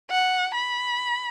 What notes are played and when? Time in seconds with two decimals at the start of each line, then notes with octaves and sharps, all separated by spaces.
0.10 F#5
0.54 B5